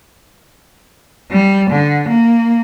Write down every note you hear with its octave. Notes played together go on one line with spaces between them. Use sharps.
G3
D3
A#3